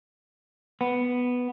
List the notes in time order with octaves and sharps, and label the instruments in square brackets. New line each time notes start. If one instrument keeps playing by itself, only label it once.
[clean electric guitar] B3